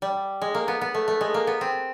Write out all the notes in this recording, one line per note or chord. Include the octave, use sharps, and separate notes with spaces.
G3
G#3
A#3
B3
B3
A3
A3
G#3
A#3
B3
C4